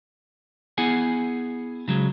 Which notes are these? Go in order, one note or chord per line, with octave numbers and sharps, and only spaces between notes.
B3 E4 G#4 F#5 G#5
C#3 F#3 G#3